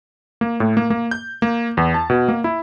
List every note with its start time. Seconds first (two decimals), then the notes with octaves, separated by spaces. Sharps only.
0.41 A#3
0.60 A2
0.77 A#3
0.90 A#3
1.11 G6
1.42 A#3
1.77 E2
1.94 A5
2.10 B2
2.28 A#3
2.44 E4